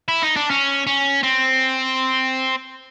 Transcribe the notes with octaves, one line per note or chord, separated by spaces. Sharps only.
E4
D#4
D4
C#4
C#4
C4